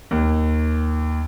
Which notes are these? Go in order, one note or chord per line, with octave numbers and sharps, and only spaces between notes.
D#2